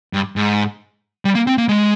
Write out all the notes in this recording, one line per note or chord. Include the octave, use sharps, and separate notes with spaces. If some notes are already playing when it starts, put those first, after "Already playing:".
G2
G#2
G3
A#3
C4
A#3
G#3